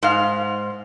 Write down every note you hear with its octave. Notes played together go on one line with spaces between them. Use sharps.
G#2 F5